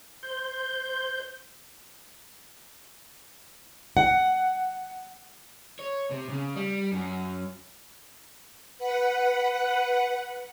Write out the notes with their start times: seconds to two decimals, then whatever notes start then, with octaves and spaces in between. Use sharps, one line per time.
0.23 C5 G6
3.97 F#5
5.79 C#5
6.11 C3
6.29 C#3
6.56 G3
6.92 F#2
8.78 B4 F#5